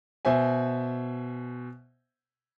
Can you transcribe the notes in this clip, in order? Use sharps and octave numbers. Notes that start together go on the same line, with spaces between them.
B2 C5 E5 G#5